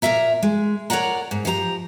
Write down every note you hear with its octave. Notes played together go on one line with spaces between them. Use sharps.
A#2 G#3 A#4 E5 A#5
G#3
A#4 C#5 D5 F#5 A#5
G#2
F3 G4 A4 A#5